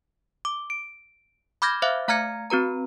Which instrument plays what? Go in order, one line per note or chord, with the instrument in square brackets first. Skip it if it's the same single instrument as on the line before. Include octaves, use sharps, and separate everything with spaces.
[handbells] D6
D7
B5 D6 F6 G6 G#6 A#6
C5 E5 F5 D6 F#6
A3 F5 A#5 F6 G#6 C#7
C4 F#4 B4 A#5